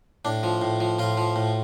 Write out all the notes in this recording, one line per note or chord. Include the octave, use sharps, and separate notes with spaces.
A2 D4
F3
A2
F3
A2 F4
F3
A2